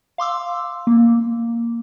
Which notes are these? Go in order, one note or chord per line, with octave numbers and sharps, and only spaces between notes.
F5 C6 D6 E6
A#3